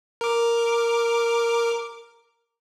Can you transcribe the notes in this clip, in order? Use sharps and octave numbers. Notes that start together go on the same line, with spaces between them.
A#4 D6